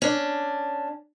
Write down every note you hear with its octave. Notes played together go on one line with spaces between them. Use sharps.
C#4 D4